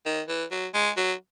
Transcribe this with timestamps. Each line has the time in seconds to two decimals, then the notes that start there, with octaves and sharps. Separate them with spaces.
0.06 D#3
0.28 E3
0.51 F#3
0.74 G#3
0.97 F#3